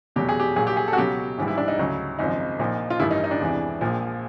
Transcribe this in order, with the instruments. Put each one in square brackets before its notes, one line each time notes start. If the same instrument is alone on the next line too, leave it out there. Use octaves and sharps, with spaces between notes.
[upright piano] F1 E2 B2 F#3 G4
G#4
G4
A#1 A#2 F#3 G#4
G4
G#4
A4
F#4
C#2 B2 F#3 G4
A#1 G#2 E3 G3
E4
D4
D#4
D2 C#3 F#3
G#1 F#2 C#3 F3 D#4
A#1 A#2 F3 D#4
F4
A1 G2 D#3 G3 E4
D#4
D#4
D4
E1 E2 C3 E3
A#1 A#2 F3